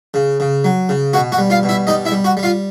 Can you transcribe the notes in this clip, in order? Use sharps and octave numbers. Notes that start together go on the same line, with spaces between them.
C#3
C#3
F#3
C#3
B2 F#4 F#5
F#4 F#5
G3
F4 F5
B2
E4 E5
G3 D#4 D#5
E4 E5
G3
F#4 F#5
G3
F4 F5